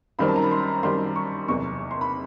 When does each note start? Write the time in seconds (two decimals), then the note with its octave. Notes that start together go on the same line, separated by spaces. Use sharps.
0.19 F#2 D#3 G3 C4 B5
0.28 A5
0.36 A#5
0.44 B5
0.51 C6
0.83 F#2 D#3 G3 C4 C6
1.16 C#6
1.48 F#1 E2 C3 C#6
1.91 C6
2.01 B5